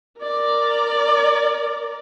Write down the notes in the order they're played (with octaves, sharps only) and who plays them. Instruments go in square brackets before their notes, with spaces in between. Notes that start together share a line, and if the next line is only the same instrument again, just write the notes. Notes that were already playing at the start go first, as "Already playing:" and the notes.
[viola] A#4 D5